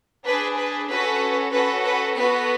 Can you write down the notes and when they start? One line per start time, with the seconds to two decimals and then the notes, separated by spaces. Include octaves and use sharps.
0.25 D4 G#4 B4
0.57 B4
0.89 C#4 F#4 A4 B4
1.53 C#4 F#4 A4 B4
1.85 B4
2.16 B3 F#4 A4 B4